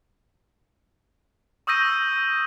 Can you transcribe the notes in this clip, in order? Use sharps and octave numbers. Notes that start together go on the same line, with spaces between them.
C#6 D#6 E6 G6 A#6 D#7